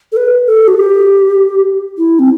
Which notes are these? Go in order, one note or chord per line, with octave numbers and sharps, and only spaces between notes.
A4
B4
A4
F#4
G4
E4
C4